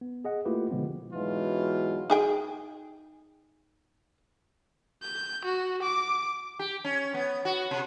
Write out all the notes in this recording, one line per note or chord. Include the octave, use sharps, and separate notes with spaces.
B3
G#4 D#5 F#5
A3 A#3 E4 F4 G4 B4
B2 D3 F3 G#3 B3 C4
G#2 B2 E3 F#3 F4
D#4 G#4 G5
G6
F#4
D6
G4
C#4
B3
F#4
C3